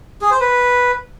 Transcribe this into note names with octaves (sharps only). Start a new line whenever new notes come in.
G#4
C5
B4